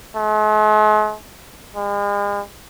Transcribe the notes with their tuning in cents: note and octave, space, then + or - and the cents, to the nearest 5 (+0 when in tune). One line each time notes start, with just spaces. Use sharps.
G#3 +45
G#3 -40